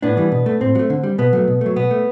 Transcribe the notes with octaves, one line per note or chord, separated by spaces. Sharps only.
A2 B3 D4
E3 G3
B2
A3
A2 C4
F#3
A3
D3
G3
B2 B3
F#3 A3
B2
F#3 A3
B2 B3
A3